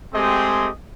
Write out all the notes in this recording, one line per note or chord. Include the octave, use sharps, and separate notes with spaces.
G#3 A3 C4 G4 G#4 D#5